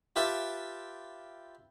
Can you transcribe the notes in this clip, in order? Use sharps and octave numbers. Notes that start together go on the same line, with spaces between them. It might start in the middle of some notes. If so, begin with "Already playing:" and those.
F4 G4 B4 E5 A5